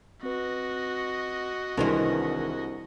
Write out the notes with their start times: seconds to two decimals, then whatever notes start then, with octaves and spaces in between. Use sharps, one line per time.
0.23 C4 F#4 B4 D#5
1.77 C2 D#3 E3 G#3 C4 D4 C5